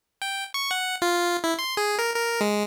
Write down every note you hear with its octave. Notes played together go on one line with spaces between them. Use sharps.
G5
C#6
F#5
F4
E4
C6
G#4
A#4
A#4
G#3